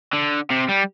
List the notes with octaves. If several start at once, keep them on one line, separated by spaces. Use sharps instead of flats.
D3
C3
G3